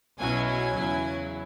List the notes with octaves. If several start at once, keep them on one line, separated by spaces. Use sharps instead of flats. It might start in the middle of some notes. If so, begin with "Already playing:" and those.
B1 B2 F#3 C#4 E4 G#5
G#5
E2 C#3 F#3 E4